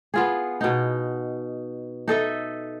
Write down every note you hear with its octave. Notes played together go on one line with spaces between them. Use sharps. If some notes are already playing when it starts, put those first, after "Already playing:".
B3 F4 G#4
B2 D#4
D#4 A4 D#5 E5